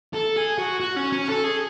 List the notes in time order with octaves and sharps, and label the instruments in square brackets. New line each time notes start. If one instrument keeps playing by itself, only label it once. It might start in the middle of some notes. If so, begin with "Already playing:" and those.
[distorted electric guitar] A4
G#4
F#4
F#4
C#4
C#4
A4
G#4